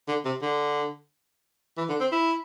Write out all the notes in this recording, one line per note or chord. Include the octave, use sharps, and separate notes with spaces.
D3
C3
D3
E3
D3
C4
E4